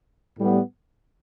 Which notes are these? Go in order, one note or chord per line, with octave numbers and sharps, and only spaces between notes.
A2 G3 B3